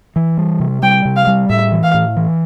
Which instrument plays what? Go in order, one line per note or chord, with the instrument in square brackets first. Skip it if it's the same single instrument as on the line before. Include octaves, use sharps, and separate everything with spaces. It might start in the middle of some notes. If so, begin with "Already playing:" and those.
[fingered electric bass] E3
G3
C3
[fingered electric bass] G3 [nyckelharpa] G5
[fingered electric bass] C3
[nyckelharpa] F5
[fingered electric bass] G3
[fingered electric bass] A2 [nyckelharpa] E5
[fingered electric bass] E3
[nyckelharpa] F5
[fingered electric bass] A2
E3